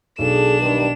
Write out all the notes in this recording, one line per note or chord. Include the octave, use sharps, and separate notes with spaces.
B1 D4 G#4 A4 E7
G2 D#3